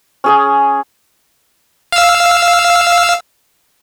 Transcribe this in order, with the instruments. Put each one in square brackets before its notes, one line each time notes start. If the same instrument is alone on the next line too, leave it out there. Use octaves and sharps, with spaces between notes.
[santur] C#4 G#4 D#6
[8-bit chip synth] F5 E6